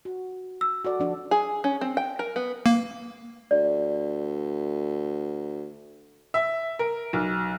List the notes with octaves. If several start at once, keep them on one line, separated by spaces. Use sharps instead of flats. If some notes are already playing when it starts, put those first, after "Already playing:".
F#4
E6
F#4 A4 D5
F3 D4
G#4
C#4
C4
G5
A#4
B3
A#3
D2 D5
E5
A#4
B1